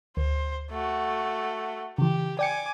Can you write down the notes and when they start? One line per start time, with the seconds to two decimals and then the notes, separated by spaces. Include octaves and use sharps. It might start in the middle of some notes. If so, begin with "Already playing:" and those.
0.17 D2 C5
0.71 A3 F#4
1.98 C#3 E3 G4
2.39 D5 G5 G#5 D6 C#7